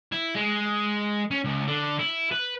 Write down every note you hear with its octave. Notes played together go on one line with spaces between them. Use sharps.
E4
G#3
C#4
C#2
D3
E4
B4